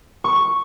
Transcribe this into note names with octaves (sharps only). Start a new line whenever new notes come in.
C#6